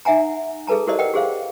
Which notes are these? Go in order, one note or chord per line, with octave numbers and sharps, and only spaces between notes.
D#4 E5 F#5 G#5 A#5
G#4 A4 B4 A5 A#5
E4 G4 A#4 C5 D5 D#5
A#4 B4 D#5 F#5 G5
G4 G#4 C5 F5